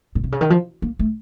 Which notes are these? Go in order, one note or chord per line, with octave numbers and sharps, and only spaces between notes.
A#2
C3
C#3
D#3
F3
A#3
A3